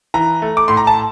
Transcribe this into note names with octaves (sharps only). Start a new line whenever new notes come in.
E3 A#5
A3
D6
A2 C6
A#5
A5